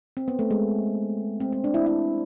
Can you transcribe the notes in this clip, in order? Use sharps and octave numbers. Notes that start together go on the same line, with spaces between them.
C4
B3
A3
G#3
C4
C4
D4
E4
E4